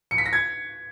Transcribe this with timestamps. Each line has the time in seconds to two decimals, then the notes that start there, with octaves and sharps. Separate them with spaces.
0.11 C#7
0.18 B6
0.26 A#6
0.33 G#6